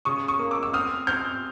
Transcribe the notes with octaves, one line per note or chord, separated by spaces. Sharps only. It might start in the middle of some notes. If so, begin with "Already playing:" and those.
C#3 C#6 D#6
C#6 D#6
A#3
D6 E6
E6
C4 D#6 F6
C4 F6 G6